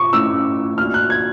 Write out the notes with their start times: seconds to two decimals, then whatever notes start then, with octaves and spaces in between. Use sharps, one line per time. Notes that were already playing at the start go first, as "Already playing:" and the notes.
Already playing: C#6 D6
0.13 A3 C#4 E4 E6
0.78 A#3 D4 F#4 F6
0.94 F#6
1.10 G#6